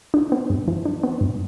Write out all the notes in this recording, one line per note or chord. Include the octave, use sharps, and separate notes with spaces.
D4
B3
G2
E3
D4
B3
G2